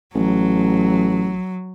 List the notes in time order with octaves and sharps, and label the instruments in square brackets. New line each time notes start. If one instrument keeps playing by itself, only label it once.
[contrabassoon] A1 [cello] F#3